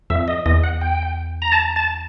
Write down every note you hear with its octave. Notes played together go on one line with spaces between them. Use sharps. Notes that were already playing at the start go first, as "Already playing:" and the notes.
F2 E5
D#5
E2 D#5
F#5
G5
A#5
A5
A5